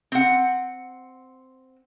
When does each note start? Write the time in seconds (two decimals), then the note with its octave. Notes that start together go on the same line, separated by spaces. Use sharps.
0.12 C4 F#5